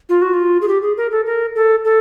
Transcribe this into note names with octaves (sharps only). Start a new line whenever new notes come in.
F4
F#4
F4
G#4
G4
G#4
A#4
A4
A#4
A4
A4